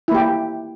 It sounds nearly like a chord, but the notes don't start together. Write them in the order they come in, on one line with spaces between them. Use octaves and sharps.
E4 A#3 G4